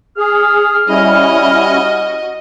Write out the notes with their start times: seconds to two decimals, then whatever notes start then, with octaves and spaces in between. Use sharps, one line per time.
0.18 G#4 F6
0.89 G3 C#4 E4 F#4 D#5